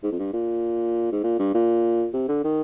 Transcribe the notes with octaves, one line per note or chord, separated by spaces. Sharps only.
G#2
F2
G2
A#2
G#2
A#2
G2
A#2
C3
D3
D#3